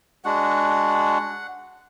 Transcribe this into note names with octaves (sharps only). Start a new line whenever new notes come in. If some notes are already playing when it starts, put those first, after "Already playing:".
G#3 D4 F#4 F#5